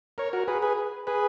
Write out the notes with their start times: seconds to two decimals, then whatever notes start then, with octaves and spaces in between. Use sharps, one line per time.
0.18 A#4 C#5
0.33 F#4 A#4
0.48 G#4 B4
0.62 G#4 B4
1.07 G#4 B4